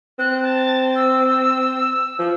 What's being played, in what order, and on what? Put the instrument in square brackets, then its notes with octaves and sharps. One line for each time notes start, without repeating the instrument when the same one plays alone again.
[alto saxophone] C4 [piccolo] F#6
[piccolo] A5
E6
[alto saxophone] F3